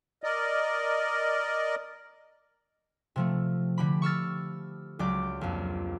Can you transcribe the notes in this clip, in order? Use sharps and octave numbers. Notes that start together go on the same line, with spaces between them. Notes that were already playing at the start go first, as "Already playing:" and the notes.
A#4 D5 D#5
C3 F3 A3
D3 G4 B5
C#6 E6 F6 A6
C#2 F#3 G4 D5 D6 G6
A#1 F2